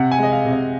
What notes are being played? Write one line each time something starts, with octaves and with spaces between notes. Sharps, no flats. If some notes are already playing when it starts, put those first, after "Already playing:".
Already playing: C3 F#5
G#5
G#3 D#5
F5
C3
D#5